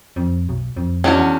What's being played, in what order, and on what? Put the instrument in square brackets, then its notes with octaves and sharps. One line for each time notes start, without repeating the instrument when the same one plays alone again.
[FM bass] F2
B1
F2
[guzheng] E2 [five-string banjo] C#4 D4 F#4